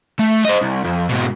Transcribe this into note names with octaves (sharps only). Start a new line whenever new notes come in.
A3
C5 D#5
C2
F2
G#2 B2